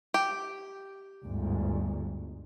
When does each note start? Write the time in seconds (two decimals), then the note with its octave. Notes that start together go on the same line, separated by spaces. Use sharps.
0.14 G4
1.25 G1 D2 G#2